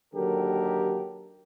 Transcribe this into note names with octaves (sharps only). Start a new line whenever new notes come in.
D#2 D3 F#3 G4 A4 A#4